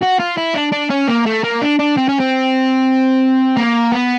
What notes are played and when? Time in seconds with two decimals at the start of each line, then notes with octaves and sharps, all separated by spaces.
0.02 F#4
0.19 F4
0.37 E4
0.55 D4
0.72 D4
0.90 C#4
1.08 A#3
1.26 A3
1.44 A#3
1.61 D4
1.79 D4
1.97 C4
2.08 C#4
2.19 C4
3.57 A#3
3.92 B3